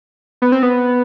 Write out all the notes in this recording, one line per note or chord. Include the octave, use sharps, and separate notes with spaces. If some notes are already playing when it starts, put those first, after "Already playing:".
B3
C4
B3